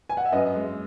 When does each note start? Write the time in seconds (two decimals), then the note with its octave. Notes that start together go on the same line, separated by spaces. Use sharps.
0.09 G#5
0.17 F#5
0.25 E5
0.32 F#2 B4 D#5
0.56 G#3